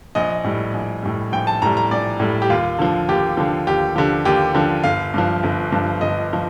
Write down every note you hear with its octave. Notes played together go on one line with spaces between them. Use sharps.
A#1 D#5
A2 G3
A#1
A2 G3
A#1 G5
A5
A2 G3 A#5
A#5
A#1 D5
A2 G3
G4
D#2 F4
D3 F3
D#2 G4
D3 F3
D#2 G4
D3 F3 G4
D#2 G4
D3 F3
G1 F5
G2 F3
G1
G2 F3
G1 D#5
F3